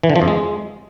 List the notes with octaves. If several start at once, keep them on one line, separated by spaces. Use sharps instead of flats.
E3
D3
F3
F2
G#3